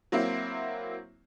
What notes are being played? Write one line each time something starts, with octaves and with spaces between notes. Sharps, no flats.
F#3 A#3 C4 E4